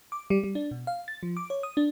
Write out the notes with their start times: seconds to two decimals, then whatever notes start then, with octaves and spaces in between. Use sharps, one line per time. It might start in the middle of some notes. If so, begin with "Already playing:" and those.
0.12 D6
0.30 G3
0.44 G3
0.55 D4
0.71 B2
0.87 F5
1.08 A6
1.23 F3
1.37 D6
1.50 C#5
1.63 D#6
1.77 D4